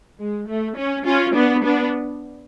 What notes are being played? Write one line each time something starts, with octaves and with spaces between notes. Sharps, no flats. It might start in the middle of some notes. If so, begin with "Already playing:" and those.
G#3
A3
C#4
C#4 F4
B3 D4
B3 D4